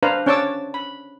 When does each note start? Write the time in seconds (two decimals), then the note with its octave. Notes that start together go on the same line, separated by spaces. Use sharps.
0.03 D4 B4 C5 F5 A#5
0.26 C#4 D4 C#5 A5 D6 E6
0.74 B5